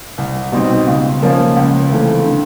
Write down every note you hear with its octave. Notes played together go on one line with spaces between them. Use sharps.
C2
B2 G3 C4 D#4
C#2
C#3 F3 A#3 C#4
C#2
C3 E3 A3 C4
D3